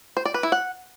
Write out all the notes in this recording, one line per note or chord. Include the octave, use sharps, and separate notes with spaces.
C5
D5
B4
E4
F#5